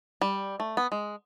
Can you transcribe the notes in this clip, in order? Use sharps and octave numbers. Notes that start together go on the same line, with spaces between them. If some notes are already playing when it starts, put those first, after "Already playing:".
G3
A3
B3
G#3